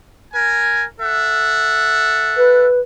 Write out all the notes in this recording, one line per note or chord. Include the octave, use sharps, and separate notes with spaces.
A#4 G#5
A4 E5 F#5
B4